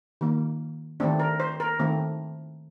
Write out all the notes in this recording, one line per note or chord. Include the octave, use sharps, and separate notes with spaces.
D#3 A#3
D#3 A3 C4 D4
A#4
C5
A#4
D#3 A3 C4